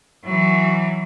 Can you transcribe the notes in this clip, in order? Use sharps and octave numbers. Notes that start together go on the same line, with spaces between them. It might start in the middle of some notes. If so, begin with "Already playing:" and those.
E3 F#3